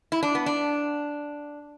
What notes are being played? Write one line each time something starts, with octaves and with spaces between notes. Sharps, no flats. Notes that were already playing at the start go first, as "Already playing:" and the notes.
E4
D4
B3
D4